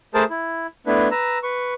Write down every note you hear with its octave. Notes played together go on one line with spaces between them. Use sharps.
A3 G#4 A#4 C5 A5
E4
A3 B3 D4 E4 B4
B4 A#5 E6
B4 C#6